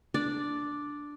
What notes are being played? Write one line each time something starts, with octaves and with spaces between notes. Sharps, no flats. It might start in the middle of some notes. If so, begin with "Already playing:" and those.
D4 D5